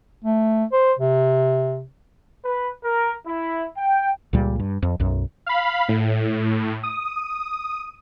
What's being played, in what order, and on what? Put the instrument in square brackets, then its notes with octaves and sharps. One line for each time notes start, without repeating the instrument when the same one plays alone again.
[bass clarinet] A3
C5
C3
[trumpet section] B4
A#4
E4
G5
[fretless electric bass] C#2 A#2 G3
G2
F2
B1 F#2
[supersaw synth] F5 B5
A2
D#6